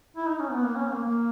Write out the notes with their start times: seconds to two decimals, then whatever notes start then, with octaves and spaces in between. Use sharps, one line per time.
0.17 E4
0.28 D#4
0.40 C#4
0.51 B3
0.63 A#3
0.76 C#4
0.90 A#3
1.04 A#3